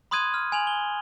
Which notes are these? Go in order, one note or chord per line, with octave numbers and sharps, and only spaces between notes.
B5 C6 D#6 F#6 G#6 D#7
F6
G#5 F7 F#7
G7